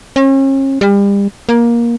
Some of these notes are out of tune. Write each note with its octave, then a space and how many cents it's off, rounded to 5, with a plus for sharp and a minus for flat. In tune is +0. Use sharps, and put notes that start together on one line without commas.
C#4 -40
G3 +35
A#3 +15